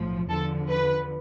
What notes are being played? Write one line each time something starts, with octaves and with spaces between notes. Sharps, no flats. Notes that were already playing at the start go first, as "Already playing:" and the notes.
Already playing: B1 A2 F3
E2 D3 F3 A4
B4